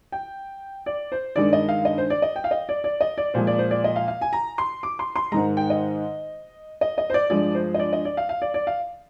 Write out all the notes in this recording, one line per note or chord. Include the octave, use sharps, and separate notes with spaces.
G5
D5
C5
G2 D#3 G#3 D5
D#5
F5
D#5
C5
D5
D#5
G5
F5
D#5
D5
D5
D#5
D5
A#2 F3 G#3 C5
D5
C5
D5
D#5
F5
F5
G#5
A#5
C6
D6
C6
C6
G#2 D#3 G#3 A#5
G5
D#5
D#5
D#5
C5
D5
G2 F3 G#3 D5
C5
D#5
D5
D#5
D5
F5
F5
D5
D5
F5